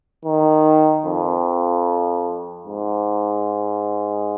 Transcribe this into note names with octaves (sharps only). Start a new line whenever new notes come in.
D#3
F2
G#2